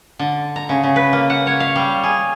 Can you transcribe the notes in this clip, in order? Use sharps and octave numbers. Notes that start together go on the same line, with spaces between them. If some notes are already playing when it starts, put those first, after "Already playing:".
D3
A#5
C#3
C#3
B4
A#3
F#5
C#5
F5
G3
G#4